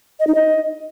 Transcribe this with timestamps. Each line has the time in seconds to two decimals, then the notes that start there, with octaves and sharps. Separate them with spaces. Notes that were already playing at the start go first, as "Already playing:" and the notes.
0.20 D#5
0.27 D#4
0.35 D#5